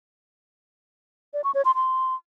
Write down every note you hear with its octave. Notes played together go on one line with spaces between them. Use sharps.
D5
C#6
C#5
C6
C6